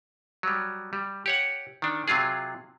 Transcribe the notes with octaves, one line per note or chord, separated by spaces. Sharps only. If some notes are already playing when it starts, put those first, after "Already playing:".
F#3 G3
G3
G4 C#5 F#5
D#3 D4
C3 F#3 F4 G#4